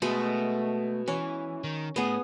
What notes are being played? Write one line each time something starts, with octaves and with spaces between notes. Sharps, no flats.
B2 G#3 A3 B5
E3 C#4
D#3
A2 B3 G#4